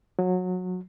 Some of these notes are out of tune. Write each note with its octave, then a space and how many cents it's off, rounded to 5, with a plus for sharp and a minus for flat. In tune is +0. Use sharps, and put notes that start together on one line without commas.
F#3 -20